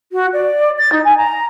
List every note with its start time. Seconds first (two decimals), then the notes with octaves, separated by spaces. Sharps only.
0.12 F#4
0.33 D5
0.78 A6
0.92 D#4
1.04 G#5
1.17 A#5